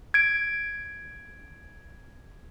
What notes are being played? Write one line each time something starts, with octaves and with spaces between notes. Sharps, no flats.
G#6 D7